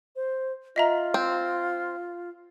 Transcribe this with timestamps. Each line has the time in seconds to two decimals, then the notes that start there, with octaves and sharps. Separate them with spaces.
0.16 C5
0.76 F4 D#5 E5 A#5
1.14 C4